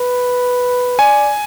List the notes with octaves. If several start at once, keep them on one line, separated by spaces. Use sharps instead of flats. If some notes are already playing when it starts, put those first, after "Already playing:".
Already playing: B4
D5 G#5